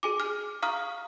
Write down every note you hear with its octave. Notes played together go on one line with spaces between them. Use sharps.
G#4 G#5 D6
F6
F5 A#5 C#6 D#6 F6